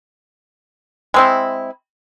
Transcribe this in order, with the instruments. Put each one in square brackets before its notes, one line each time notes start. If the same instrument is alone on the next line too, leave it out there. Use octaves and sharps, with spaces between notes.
[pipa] G#3 C4 E4